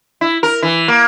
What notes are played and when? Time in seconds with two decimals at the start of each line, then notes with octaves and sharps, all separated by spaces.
0.21 E4
0.43 A#4
0.63 E3
0.88 A#3